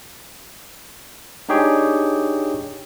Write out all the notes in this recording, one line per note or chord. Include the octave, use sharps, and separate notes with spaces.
D4 D#4 G4 G#4 C#5 G5